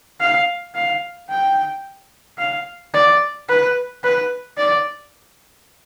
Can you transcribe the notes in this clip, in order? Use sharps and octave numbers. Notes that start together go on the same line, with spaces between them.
F5
F5
G5
F5
D5
B4
B4
D5